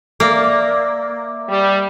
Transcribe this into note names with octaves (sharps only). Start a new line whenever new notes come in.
A#3 D5 E5
G3